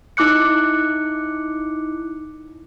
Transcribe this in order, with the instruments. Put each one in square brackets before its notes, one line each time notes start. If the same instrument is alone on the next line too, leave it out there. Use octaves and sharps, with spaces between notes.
[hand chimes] D#4 E4 D6 F#6 C#7